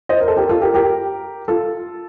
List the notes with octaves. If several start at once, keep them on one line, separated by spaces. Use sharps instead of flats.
C5 D#5
A#4
A4 C5
G4 A#4
F4 A4
G4 A#4
G4 A#4
F4 A4